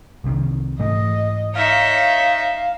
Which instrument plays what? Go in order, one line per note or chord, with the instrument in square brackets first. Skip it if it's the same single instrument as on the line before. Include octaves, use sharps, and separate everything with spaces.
[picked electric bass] C2 C3 D#3
[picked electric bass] G#2 E3 A3 [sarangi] D#5
[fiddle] D#4 E5 [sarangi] C#5 [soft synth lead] F5